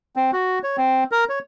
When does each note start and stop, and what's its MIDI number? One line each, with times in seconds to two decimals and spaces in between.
0.16 0.31 60
0.33 0.59 66
0.63 0.77 73
0.78 1.04 60
1.12 1.24 70
1.29 1.39 73